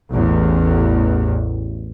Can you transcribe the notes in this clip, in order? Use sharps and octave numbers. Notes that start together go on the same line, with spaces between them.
A1 E2